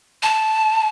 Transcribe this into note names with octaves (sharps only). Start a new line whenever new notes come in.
A5